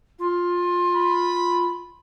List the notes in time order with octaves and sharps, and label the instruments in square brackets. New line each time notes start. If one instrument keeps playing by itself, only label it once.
[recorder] F4
[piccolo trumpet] B5